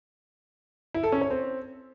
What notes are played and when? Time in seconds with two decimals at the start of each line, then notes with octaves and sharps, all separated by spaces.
0.94 E4
1.03 A4
1.12 C#4
1.21 C#5
1.30 C4